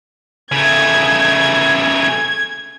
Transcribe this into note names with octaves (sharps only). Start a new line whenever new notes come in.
C#3 A3 G#6